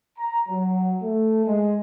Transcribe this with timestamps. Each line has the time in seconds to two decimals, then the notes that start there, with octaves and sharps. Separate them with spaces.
0.18 A#5
0.49 F#3
1.03 A3
1.46 G#3